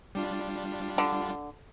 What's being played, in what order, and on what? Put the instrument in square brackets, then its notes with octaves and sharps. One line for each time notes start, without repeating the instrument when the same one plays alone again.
[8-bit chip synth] G3 D4 F4
[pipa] D3